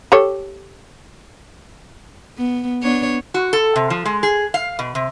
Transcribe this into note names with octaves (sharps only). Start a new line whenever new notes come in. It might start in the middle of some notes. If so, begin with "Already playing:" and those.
G4 A4 C#5
B3
B3 D4 C#5
F#4
A4
C3
F3
G#3
G#4
F5
B2
C3